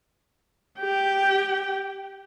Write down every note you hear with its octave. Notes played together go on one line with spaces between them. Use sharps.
G4 G5